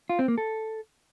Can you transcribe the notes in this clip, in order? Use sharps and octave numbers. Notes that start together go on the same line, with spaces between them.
F4
C4
A#3
A4